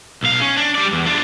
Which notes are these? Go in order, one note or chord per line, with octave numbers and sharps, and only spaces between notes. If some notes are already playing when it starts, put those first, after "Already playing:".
B1 F5
C#4
D4
G3 D5
E2
D4 F4